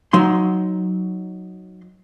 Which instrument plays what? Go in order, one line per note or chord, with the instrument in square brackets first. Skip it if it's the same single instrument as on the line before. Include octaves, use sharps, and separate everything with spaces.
[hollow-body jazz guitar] F#3 D#4 C6